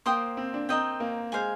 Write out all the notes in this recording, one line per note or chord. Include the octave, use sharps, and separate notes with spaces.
A#3 C5 G5 C6 D#6
C4
D4
C4 A#4 D#5 G5
A#3
G#3 C5 F5 G#5